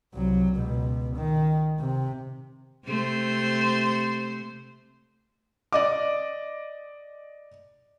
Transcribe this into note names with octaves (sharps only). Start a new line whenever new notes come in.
C2 F#3
C#2 B2
D#3
C3
C3 A3 C5
D5 D#5 D6